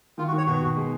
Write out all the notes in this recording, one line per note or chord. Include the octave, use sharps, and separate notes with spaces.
D#3 F4
F#4
D#3
C#5
B2 F#4
B2
G#3